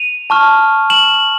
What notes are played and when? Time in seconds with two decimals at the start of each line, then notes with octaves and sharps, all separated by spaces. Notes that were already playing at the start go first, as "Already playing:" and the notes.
Already playing: D#7 F7
0.30 A5 C#6 F6
0.90 E7 F#7